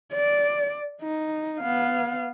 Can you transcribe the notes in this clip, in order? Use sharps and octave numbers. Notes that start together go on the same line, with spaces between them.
D5
D#4
B3 F5